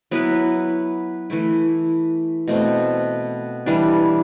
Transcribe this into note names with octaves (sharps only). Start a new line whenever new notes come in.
F#3 B3 E4 B4
E3 A3 E4
B2 A3 C4
E3 G3 D4